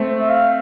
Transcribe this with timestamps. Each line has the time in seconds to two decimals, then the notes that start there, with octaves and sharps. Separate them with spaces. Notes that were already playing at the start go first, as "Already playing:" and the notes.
Already playing: A3 C4
0.20 E5
0.29 F5